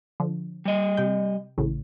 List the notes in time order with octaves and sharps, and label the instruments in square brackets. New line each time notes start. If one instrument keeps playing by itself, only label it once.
[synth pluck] D3 F3
[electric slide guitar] G3 D#5
[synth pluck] C3 G5
A1 A2 C#3